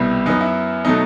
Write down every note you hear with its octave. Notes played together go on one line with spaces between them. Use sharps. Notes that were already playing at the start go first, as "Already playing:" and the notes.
Already playing: C2 B2 G3 B3 E4
F#2 F#3 B3 D#4
E4
B2 F#3 A3 D#4